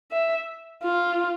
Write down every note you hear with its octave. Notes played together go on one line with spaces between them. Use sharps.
E5
F4